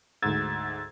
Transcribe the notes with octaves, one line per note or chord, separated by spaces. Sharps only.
D2 G#2 E6 G#6 A6